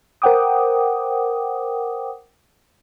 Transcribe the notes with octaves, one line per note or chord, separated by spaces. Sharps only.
A#4 C5 F#5 G5 D6 D#6